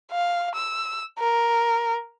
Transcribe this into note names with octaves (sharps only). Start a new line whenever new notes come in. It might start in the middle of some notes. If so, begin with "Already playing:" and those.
F5
E6
A#4